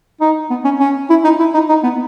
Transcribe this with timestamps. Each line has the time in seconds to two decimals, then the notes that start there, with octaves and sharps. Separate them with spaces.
0.21 D#4
0.50 B3
0.65 C#4
0.80 C#4
1.10 E4
1.24 D#4
1.39 E4
1.54 D#4
1.69 D#4
1.84 B3